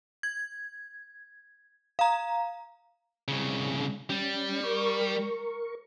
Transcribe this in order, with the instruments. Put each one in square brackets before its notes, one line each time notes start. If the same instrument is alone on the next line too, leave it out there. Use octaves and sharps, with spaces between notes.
[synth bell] G#6
F5 A#5
[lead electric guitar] C2 C#3
[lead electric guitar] G3 [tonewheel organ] C#4
[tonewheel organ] A#4 C#6